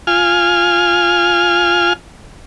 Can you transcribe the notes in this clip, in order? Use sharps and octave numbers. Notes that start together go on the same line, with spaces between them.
F4 G#5 F6